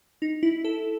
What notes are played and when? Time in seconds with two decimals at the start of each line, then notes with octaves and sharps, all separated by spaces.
0.22 D#4
0.43 E4
0.64 A4